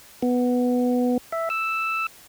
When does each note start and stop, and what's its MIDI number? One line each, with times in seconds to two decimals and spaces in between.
0.22 1.18 59
1.32 1.49 76
1.50 2.07 88